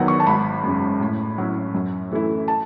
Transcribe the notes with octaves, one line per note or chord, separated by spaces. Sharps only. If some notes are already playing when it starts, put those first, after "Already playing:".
Already playing: E2 D#3 F#3 B3 F#5
C#6
A5
G#1 B5
F#2 C#3
A2
F#3 C#4 E4
F#2
E3 A3 E4
A5